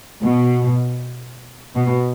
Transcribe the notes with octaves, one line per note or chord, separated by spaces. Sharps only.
B2
B2